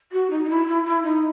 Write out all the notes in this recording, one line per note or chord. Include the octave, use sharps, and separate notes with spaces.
F#4
D#4
D#4
E4
E4
E4
D#4